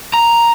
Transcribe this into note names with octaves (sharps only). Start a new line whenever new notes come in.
A#5